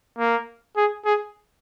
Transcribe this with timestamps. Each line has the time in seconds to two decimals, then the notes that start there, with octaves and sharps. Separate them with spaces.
0.19 A#3
0.77 G#4
1.05 G#4